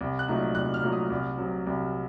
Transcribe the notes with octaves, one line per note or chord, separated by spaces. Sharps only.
C2
F#6
A#2 F#3 A3 D#4
C2 F#6
F6
A#2 F#3 A3 D#4
D#6
C2
C3 F#3
C2